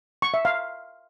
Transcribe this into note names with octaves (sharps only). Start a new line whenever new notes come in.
C#6
E5
F5